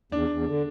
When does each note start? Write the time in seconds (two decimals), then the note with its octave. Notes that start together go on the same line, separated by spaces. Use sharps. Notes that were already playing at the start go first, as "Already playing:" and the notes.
0.12 E2 D4
0.29 E2
0.47 D3